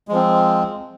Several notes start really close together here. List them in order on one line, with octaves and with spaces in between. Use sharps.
G#3 F3 C4